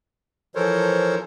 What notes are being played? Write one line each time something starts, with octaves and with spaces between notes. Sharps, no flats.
E3 F3 A4 A#4 C5 C#5